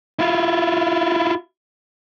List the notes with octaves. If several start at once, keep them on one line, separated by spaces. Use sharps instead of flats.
E4 F4